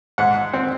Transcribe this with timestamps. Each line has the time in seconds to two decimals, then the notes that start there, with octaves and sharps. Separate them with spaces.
0.18 G#2 F#5
0.53 C4